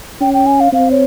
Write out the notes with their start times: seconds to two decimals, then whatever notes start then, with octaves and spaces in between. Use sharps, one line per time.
0.21 C#4 G5
0.34 G5
0.46 G#5
0.60 F5
0.73 C4 F5
0.91 C#5